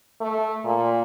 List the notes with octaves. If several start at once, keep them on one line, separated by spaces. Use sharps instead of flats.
A3
A#2